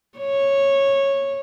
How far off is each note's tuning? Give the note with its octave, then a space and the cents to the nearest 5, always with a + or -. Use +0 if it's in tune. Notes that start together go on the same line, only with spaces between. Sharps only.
C#5 -10